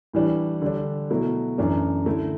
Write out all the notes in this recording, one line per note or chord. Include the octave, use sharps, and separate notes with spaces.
A2 E3 G3 D4
D3 G3 D4
B2 F#3 A3 E4
F#2 E3 A3 D4
D3 A3 E4